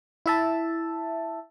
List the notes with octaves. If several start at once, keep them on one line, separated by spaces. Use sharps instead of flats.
E4 E5 A5